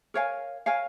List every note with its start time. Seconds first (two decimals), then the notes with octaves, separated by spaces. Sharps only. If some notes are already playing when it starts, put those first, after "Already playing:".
0.14 A#4 C#5 F5 G#5
0.66 A#4 C#5 F5 G#5